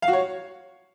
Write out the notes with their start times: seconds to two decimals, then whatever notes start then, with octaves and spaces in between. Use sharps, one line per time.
0.02 F5
0.08 F#4
0.13 C#5